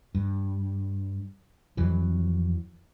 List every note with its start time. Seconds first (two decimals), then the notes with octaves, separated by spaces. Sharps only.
0.15 G2
1.77 F2 E3 F#3